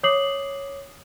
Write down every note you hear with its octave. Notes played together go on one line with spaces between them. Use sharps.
C#5 D6 D#6 C7 F#7